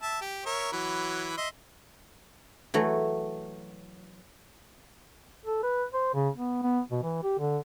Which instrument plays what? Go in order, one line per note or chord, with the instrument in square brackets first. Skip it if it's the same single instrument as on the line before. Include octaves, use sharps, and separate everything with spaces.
[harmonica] E5 A5
G4
A#4 C#5 E5
E3 F#3 B5
D#5 E5 C6
[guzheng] E3 F#3 A3
[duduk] A4
B4
C5
C#3
B3
B3
B2
E3
G4
D3